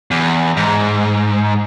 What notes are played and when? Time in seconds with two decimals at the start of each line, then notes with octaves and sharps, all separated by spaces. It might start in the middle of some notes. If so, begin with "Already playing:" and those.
0.11 E2
0.57 G#2